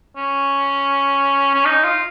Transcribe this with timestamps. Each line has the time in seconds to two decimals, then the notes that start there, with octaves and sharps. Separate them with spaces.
0.17 C#4
1.54 C#4
1.65 D#4
1.84 F4